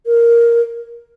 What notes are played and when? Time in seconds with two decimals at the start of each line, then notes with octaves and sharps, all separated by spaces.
0.06 A#4